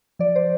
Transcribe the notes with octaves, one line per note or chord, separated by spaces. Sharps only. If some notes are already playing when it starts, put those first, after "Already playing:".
F3 D5
C5